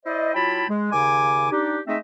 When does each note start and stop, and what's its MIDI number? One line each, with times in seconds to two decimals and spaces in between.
0.05 0.31 64
0.05 0.31 72
0.05 0.31 74
0.05 0.31 75
0.34 0.64 54
0.34 0.64 64
0.34 0.64 65
0.34 0.64 79
0.34 0.64 81
0.34 0.64 83
0.68 0.89 56
0.92 1.50 39
0.92 1.50 49
0.92 1.50 80
0.92 1.50 86
1.50 1.78 62
1.50 1.78 63
1.50 1.78 67
1.87 1.96 56
1.87 1.96 57
1.87 1.96 60
1.87 1.96 63
1.87 1.96 75
1.87 1.96 76